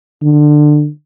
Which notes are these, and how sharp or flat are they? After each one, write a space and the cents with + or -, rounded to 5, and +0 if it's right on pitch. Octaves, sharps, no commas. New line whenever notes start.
D3 +20